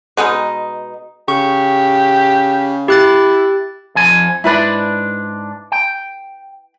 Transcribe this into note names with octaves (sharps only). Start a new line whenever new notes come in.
B2 G#3 B3 D#4
C#3 G4 C#6
E4 G4 F#6 A6
F2 F3 G#5
G#2 D4 E4 B4 B5
G5